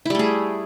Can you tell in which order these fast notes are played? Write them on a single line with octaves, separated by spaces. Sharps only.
E4 G3 A3 G#4